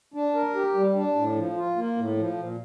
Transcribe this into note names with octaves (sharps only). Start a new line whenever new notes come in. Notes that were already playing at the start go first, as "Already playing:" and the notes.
D4
A#4
G4
G3
D4
A2
F3
F4
A#3
A2
F3
A#2